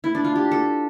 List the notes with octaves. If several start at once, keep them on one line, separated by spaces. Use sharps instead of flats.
E4
D4
F4
G4
A4